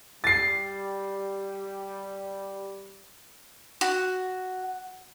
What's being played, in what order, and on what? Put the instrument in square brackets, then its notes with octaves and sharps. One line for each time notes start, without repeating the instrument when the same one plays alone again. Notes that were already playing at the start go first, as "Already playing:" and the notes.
[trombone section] G3 [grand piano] A6 C7
[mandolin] F#4